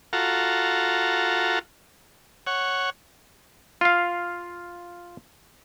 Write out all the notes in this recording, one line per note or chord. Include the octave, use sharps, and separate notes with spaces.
F4 F#4 A4 A#5
C#5 F#5
F4 F5